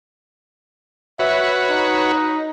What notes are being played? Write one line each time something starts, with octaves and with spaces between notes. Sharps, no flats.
F#4 B4 C#5 E5
D#4